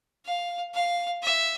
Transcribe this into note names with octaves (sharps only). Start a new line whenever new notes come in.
F5
F5
E5